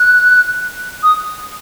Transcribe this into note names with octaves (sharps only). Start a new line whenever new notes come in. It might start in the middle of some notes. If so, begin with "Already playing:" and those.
Already playing: F#6
D#6